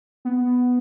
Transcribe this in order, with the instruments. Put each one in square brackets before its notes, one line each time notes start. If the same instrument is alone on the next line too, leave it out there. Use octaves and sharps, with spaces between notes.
[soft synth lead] B3